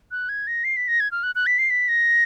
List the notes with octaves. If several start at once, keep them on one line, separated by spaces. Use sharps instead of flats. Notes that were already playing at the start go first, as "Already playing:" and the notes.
F#6
G#6
A#6
C7
B6
A#6
G#6
F6
F#6
F#6
B6
C7
B6
A#6